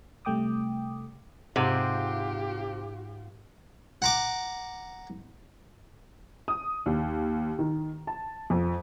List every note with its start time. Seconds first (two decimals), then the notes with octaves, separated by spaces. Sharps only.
0.25 C3 G3 A3 G5 D6 D#6
1.56 G#2 C3 F4 G4 F#5 C6
4.02 F#5 A#5 D6
6.48 D#6
6.86 D#2
7.59 D#3
8.07 A5
8.50 F2